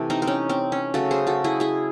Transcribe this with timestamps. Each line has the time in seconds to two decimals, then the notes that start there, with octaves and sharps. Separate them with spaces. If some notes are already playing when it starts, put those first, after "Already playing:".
Already playing: C3 E3 A3
0.10 C4 D#4
0.22 C4
0.27 C#4
0.49 C4
0.72 C#4
0.94 C#3 F#3 A3 F#4 A4
1.11 G#4 C5
1.27 F#4 A4
1.44 E4 G#4
1.60 E4 G#4